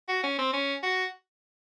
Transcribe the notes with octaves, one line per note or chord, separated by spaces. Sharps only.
F#4
C#4
C4
C#4
F#4